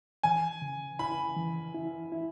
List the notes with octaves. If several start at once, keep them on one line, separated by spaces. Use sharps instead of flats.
E3 G#5
C#3
E4 B5
E3
E4
E4